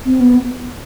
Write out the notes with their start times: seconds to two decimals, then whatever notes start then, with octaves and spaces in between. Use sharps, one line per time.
0.06 C4
0.21 B3